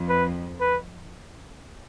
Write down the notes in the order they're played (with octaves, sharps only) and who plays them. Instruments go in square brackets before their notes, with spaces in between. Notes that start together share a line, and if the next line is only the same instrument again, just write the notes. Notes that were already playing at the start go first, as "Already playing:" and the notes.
Already playing: [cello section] F2
[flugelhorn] B4
B4